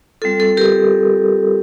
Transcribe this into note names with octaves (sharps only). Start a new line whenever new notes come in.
G3 C4 F4 A4
A4
G4 A#4